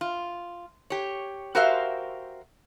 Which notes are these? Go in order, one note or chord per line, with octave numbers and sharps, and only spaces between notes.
F4
G4 C#5
F#4 G4 A#4 C5 E5 F5